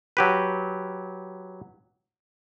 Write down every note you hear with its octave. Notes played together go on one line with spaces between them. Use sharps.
F#3 G4 B4